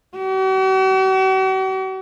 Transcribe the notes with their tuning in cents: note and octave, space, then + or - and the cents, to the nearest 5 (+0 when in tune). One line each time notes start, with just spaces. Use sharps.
F#4 +45